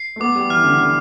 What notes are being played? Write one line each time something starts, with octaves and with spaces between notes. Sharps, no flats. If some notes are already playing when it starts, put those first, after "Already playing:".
Already playing: C7
A3
B3 D6
G3
E3 F6
D3
D3 F6